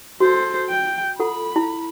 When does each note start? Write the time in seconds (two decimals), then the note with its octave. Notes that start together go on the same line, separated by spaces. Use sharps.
0.20 F#4 A4 C5
0.70 G5
1.20 F4 A4 F#5 B5
1.56 E4